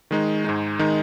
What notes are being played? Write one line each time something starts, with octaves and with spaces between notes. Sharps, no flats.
D#3 G#3 D#4
G#2 G#3 D#4
D#3 G#3 D#4